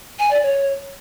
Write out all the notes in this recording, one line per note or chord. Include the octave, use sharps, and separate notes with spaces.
G#5
D5
C#5